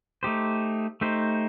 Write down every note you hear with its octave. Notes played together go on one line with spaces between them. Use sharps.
A3 D#4 G4 C5
A3 D#4 G4 C5